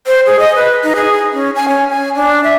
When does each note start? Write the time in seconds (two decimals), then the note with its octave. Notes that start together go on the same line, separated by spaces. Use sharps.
0.07 C5
0.26 G#4
0.39 D#5
0.56 B4
0.83 D#4
0.96 G#4
1.33 C#4
1.55 G#5
1.68 C#4
1.91 G#5
2.15 D4
2.44 E5